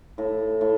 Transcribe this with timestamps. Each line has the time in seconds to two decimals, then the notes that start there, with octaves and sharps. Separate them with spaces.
0.18 A2
0.61 A2